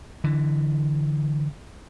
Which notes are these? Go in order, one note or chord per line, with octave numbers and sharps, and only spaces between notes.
D3 E3